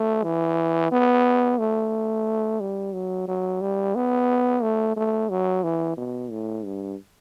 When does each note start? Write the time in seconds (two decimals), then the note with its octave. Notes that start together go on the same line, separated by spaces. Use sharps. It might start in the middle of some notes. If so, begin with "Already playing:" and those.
Already playing: A3
0.23 E3
0.91 B3
1.58 A3
2.60 G3
2.93 F#3
3.28 F#3
3.61 G3
3.95 B3
4.63 A3
4.97 A3
5.30 F#3
5.63 E3
5.97 B2
6.31 A2
6.65 G2